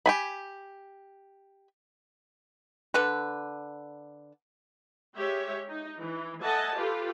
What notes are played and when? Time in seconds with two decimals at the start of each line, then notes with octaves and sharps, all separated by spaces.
0.06 G4 G#5 B5
2.94 D3 A4 B4
5.17 G#3 G4 C#5 E5
5.69 D#4
5.98 E3
6.41 A4 D#5 E5 F#5 G#5 A5
6.76 F4 G4 A4 B4